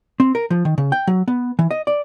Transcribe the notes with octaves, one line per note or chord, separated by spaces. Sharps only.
C4
A#4
F3
D#3
C#3
G5
F#3
B3
E3
D#5
D5